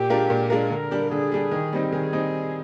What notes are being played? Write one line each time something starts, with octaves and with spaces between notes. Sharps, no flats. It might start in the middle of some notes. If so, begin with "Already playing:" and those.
Already playing: A#2 G4
G#3 D4 F4 A#4
A#2
G#3 D4 F4 A#4
D3 A#4
G3 D4 G4
D3 G#4
G3 D4 G4
D#3
G3 C4 D#4
D#3 G#4
G3 C4 D#4